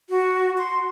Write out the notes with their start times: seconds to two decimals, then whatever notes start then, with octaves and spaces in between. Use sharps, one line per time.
0.10 F#4
0.58 C6